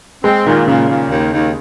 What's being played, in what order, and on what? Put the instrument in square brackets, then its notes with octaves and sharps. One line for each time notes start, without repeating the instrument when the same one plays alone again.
[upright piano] G#3 [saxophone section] C4
[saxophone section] A#2 [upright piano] D#3
[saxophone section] A#2 [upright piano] C#3
[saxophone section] A#2
D#2
D#2